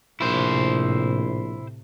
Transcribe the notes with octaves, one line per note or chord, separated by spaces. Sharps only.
A#1 A2 C3 E4 C5